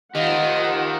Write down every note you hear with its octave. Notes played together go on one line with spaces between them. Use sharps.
D#3 F4 G4 C5 D#5 F5 F#5